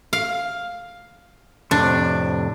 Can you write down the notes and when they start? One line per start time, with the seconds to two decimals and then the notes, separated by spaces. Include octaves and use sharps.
0.13 F5
1.71 F2 A2 C3 D4